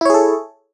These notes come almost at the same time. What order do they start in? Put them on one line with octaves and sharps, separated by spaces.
E4 C#5 G#4 A4